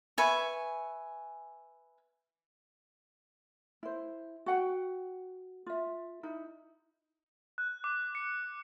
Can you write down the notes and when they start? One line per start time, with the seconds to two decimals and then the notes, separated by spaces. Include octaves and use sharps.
0.18 B4 E5 G#5 C#6
3.83 E4 C5
4.46 F#4 F#5 G5
5.66 F4 E5
6.23 D#4 E4
7.58 F#6
7.84 D6
8.15 C#7